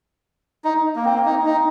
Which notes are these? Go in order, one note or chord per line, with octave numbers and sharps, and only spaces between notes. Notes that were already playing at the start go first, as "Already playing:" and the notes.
D#4
A#3
C4
A#3
D#4
D#4